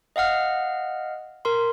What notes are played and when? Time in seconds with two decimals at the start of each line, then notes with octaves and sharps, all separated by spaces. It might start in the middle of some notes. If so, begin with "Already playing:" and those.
0.16 D#5 F5 F#5 F6
1.45 A#4 C6